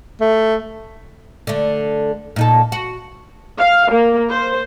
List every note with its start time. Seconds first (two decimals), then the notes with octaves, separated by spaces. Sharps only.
0.21 A3
1.47 D3 A3
2.36 A#2 D#4 A4
2.72 F#4
3.58 F5
3.91 A#3
4.31 C5